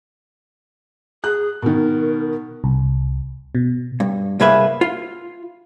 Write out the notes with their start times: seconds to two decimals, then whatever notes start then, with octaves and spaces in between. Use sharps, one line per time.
1.24 G#4 F#6
1.62 B2 D#3 A#4
2.64 C2
3.55 B2
4.00 G2
4.40 C2 G2 A#3 G#4 B4 E5
4.81 F4